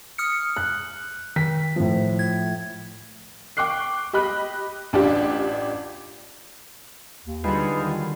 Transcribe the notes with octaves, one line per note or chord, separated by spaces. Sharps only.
D#6 F6 C#7
F#6
D#3 B6
A2 F3
G#6
G5 C#6 D6 F#6 C7
G4 D#5 B5 F#6
A1 D4 F4 G4
D#2
D3 F#3 G3 D#4 F4 G#4 B4
D#3